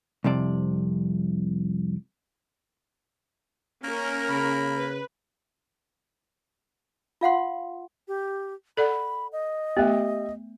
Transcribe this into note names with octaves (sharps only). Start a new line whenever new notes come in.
C2 F2 C3 D5
A#3 C#4 A#4
C#3 B5
B4
F4 F5 F#5 C6
G4
A4 D5 F#5 B5
D#5
A3 B3 G4 E5